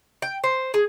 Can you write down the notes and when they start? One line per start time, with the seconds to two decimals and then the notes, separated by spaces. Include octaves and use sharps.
0.22 G5
0.44 C5
0.74 G#4